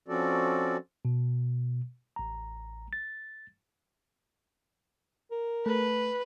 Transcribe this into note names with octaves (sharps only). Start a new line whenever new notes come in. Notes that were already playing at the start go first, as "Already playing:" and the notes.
F3 C4 C#4 F#4 A4 D5
B2
A1 A#5
A6
A#4
A3 B4